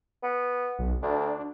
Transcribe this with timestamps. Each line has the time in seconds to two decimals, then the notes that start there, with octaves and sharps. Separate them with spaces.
0.23 B3
0.79 B1
1.03 D2 D4